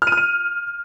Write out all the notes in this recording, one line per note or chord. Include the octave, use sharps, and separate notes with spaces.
F6
D#7
F6
D#7